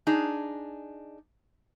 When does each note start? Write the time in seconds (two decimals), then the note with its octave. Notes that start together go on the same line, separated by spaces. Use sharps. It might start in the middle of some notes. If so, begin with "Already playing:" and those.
0.07 D4 D#4 G#4